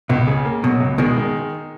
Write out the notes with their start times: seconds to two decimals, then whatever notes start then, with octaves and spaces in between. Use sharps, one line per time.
0.09 C#2 B2
0.27 C#3
0.45 A#3
0.63 B2 F#3
0.80 C#2
0.98 B2 D#3 G#3
1.17 D#3